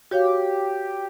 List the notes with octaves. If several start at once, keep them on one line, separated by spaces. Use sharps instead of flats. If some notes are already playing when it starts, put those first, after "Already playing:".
F#4 G4 C#5 F5